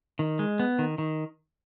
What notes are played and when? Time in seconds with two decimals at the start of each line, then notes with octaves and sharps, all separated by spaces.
0.19 D#3
0.39 G#3
0.60 B3
0.79 D#3
0.98 D#3